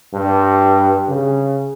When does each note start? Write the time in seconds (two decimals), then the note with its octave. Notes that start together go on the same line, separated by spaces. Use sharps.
0.13 G2
1.08 C#3